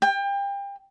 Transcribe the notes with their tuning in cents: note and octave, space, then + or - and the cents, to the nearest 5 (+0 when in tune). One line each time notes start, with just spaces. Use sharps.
G5 +30